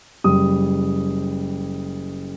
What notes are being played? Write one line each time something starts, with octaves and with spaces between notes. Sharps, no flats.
F#1 G3 D#6